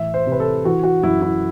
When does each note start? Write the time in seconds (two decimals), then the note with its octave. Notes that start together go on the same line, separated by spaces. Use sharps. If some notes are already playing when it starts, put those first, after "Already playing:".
Already playing: A2 E3 E5
0.14 C5
0.26 C3
0.32 B4
0.40 A4
0.65 E3 F#4
0.83 F#4
1.03 F#2 E4
1.22 E4